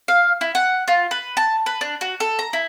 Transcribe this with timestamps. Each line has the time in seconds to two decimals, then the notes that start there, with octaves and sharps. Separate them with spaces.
0.08 F5
0.41 E4
0.55 F#5
0.88 F4
1.11 B4
1.37 A5
1.66 B4
1.81 D4
2.01 F#4
2.20 A4
2.39 A#5
2.53 E4